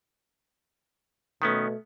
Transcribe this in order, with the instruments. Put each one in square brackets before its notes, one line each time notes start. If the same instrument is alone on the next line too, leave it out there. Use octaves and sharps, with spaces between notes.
[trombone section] B2 A3 [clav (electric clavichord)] D#3 B3 C#4